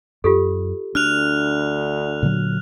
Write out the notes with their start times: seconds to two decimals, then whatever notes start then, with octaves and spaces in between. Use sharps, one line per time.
0.24 F#2 F4 G4 A4
0.95 D2 D4 F6 F#6 F7
2.22 A#2 D3 F#3